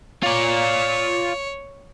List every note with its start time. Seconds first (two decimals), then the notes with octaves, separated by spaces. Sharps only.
0.23 F4 C#5 D5